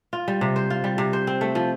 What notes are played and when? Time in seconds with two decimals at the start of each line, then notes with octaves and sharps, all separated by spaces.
0.13 F4
0.28 G3
0.41 C3
0.56 C5
0.70 F4
0.84 G3
0.98 C3
1.13 C5
1.27 C4
1.41 A3
1.55 F3